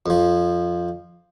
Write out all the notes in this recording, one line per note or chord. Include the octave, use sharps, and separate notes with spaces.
F2 F3